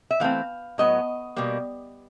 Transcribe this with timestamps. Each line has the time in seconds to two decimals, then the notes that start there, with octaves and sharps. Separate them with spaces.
0.11 E5
0.20 E3 A3 C4 F5
0.78 A2 F#3 B3 D#5
1.36 B2 G3 A#3